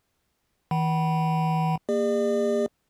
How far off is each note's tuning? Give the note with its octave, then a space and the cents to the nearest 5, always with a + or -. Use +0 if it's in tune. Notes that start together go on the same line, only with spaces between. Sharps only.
E3 -35 F#5 +35 B5 -15
A#3 +0 G#4 -40 D5 +40